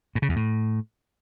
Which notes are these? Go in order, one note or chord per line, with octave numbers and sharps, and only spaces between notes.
A2
C#3
E2
A2